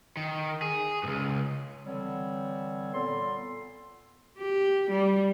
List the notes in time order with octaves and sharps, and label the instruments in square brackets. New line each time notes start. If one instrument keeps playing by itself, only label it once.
[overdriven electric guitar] D#3
G#4
C#2 G2
[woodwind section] D3 E3 G3 C4 C#5
A#2 B3 A4 C6
[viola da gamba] G4
G3